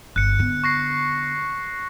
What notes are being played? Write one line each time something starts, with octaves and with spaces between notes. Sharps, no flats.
G1 F#6 C#7
D3 B3
C#6 A#6 C7